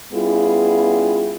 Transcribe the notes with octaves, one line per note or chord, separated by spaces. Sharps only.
G3 B3 C#4 E4 F4 G#4